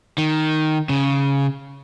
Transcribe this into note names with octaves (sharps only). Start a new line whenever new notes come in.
D#3
C#3